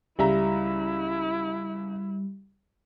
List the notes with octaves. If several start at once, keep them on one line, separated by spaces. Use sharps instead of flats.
C#2 G3 E4 E5 A#5